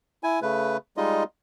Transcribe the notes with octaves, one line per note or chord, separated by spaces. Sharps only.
E4 G#5
C#3 A3 B4
G3 G#3 D#4 F4 D#5